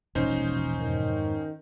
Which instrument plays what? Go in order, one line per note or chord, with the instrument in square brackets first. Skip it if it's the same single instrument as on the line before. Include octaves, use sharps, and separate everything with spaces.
[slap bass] E1 [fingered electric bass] A1 A#2 F3 [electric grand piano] C#4 D#4 C5
[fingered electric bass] F2 G#2 [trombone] D#3